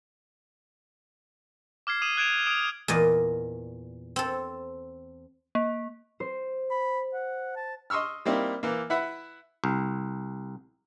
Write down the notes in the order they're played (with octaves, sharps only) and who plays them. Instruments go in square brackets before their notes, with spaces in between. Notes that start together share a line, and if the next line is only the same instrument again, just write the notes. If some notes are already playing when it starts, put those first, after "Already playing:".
[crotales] D6 F6 G#6 C7
D#6 D#7 E7 F#7
F#6 G#6 D7 E7 F7
D#6 D7 E7
[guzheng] E2 A#2 D5 D#5
C4 A4
[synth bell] A#3
[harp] C5
[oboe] B5
F#5
A5
[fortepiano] D#5 C6 C#6 E6 F6
G3 A#3 C4 D#4 E4
E3 A#3
E4 B4 E5 F#5
[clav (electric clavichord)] C2